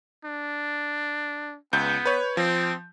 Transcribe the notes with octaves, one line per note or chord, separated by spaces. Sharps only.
D4
C#2 B3 G6
B4 C#5
F3 C4